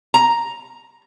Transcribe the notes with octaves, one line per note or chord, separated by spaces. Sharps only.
A#5